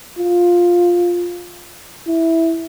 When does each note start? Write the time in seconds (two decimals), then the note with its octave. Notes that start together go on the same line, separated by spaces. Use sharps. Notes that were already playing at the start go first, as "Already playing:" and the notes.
0.19 F4
2.07 E4